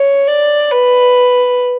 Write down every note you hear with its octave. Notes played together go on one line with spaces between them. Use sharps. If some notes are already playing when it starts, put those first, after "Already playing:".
Already playing: C#5
D5
B4